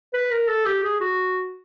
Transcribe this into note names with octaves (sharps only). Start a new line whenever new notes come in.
B4
A#4
A4
G4
G#4
F#4